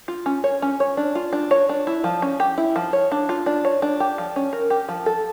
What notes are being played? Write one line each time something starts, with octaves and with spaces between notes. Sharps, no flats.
F4
C#4
C#5
C#4
C#5
D4
F4
D4
C#5
D4
E4
F3
C#4
G4
E4
F3
C#5
D4
F4
D4
C#5
D4
G4
F3
C#4
A#4
G4
F3
A4